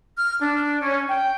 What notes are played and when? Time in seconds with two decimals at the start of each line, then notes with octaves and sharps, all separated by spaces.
0.17 F6
0.40 D4
0.81 C#4
1.08 G5